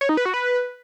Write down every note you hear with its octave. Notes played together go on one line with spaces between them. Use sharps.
C#5
D#4
B4
F#4
B4